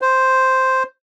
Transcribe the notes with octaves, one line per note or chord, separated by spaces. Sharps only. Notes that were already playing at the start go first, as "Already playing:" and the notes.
C5